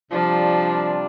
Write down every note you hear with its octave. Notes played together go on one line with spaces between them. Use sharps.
C3 F3 G3 D4 F4 D5